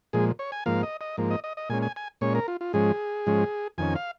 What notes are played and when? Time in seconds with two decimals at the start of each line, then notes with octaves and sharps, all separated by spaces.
0.13 A#2 F3 G#3 G#4
0.39 C#5
0.52 G#5
0.66 G#2 F3 A#3 F5
0.83 D#5
1.01 D#5
1.17 G#2 F3 A#3
1.31 D#5
1.44 D#5
1.57 D#5
1.69 A#2 G#3 C#4 G#5
1.82 G#5
1.96 G#5
2.21 A#2 G#3 C#4 C#5
2.35 A#4
2.48 F4
2.61 F4
2.73 G#2 F3 G#3 C#4 G#4
3.26 G#2 F3 G#3 C#4
3.78 F2 D#3 C#4 G#5
3.96 F5